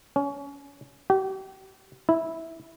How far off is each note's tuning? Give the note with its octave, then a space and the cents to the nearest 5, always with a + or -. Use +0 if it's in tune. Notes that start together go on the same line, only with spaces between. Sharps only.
C#4 +25
G4 -40
E4 -10